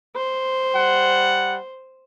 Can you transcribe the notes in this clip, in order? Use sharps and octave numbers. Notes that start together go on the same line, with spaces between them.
C5
G3 F#5